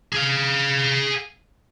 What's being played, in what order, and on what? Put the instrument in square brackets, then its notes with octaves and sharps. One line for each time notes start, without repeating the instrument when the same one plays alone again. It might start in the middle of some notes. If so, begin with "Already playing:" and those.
[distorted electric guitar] G#4 F5